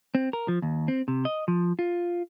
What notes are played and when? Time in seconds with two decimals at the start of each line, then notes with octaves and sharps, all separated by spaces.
0.15 C4
0.33 A#4
0.48 F3
0.62 D#2
0.88 C4
1.08 C3
1.25 D#5
1.48 F3
1.79 F4